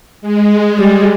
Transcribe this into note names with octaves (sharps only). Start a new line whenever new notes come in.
G#3
G3